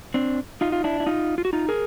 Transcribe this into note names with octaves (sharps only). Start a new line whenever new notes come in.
C4 D4
D#4 F4
F4
D4 E4
E4
D#4 F4
F4
F#4
D#4 F4
G#4 A#4